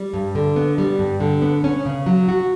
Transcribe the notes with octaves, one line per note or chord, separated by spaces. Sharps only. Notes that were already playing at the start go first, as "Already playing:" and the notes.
Already playing: G3
G2
D3
B3
G3
G2
D3
B3
C#4
C#3
F#3
F#4